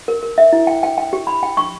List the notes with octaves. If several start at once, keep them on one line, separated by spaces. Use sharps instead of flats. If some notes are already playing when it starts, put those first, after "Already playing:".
A#4
A#4
E5
E4
G5
G5
G5
G4
B5
G5
C#6